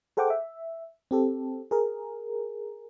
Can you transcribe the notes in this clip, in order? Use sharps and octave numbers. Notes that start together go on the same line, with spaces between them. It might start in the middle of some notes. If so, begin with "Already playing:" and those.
G#4 A4 C5 F#5 G5 D6
E5
C4 G4 A4
G#4 A#4